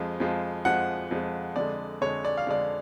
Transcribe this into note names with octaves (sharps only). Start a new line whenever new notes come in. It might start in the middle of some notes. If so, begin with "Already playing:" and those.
Already playing: F2 F3 G#3
F2 F3 G#3
F2 F3 G#3 F#5
F2 F3 G#3
F2 D3 G#3 D5
F2 D3 G#3 C#5
D5
F5
F2 D3 G#3 D5